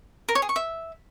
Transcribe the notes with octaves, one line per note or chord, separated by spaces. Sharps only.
A#4
C#5
G#4
C#6
E5